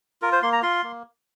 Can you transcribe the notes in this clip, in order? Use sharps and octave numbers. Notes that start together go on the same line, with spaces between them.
F4 A#4
C5
A#3 C6
A#5
F4 C6
A#3